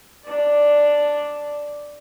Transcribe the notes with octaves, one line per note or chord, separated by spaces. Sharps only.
D4 D5